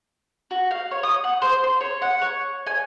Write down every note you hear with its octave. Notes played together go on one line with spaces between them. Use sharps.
F#4
F5
C#5
D#6
F#5
C5
C6
C#5
F#5
C#5
G#5